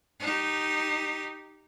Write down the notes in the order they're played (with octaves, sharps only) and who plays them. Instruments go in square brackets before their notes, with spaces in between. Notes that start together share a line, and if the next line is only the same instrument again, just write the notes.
[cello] D#4 G4